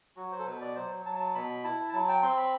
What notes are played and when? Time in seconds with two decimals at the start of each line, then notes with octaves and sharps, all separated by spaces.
0.17 F#3 F#4
0.32 C5
0.39 A4
0.46 B2 B4
0.61 D5
0.76 F#3 C5
1.05 F#3 A5
1.20 A5
1.35 B2 B5
1.64 E4 A5
1.93 F#3 A5
2.08 G5
2.23 C4 C6
2.37 B5